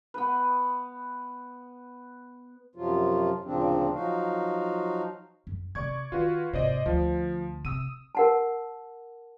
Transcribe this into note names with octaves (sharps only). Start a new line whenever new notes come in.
B3 B4
F#2 C3 F3 F#3 F4
D2 A#2 C#3 F3 C4 D4
F3 F#3 D#4 F#4 F5
F#2
C3 C4 D5 C#6 G#6
D#3 F4 F#4 B4
G#1 C3 C5 D5 D#5
D2 F3
C3 D#6 E6 D#7
A#4 F#5 A5